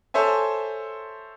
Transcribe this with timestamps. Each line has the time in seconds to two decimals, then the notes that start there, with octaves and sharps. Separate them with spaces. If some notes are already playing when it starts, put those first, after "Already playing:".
0.14 A4 C5 C#5 E5 G#5